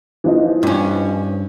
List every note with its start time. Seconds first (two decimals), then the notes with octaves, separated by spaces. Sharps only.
0.24 E3 F3 D#4
0.63 G2 C#4